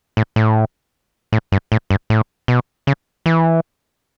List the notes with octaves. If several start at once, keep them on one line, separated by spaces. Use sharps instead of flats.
A2
A2
A2
G2
A2
G2
A2
B2
C#3
E3